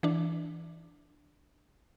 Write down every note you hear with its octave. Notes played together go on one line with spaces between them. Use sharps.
E3 D4